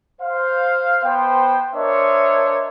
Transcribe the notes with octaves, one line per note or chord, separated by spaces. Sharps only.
C5 F5
B3 C5 G5
D4 A#4 C5 C#5 D#5 E5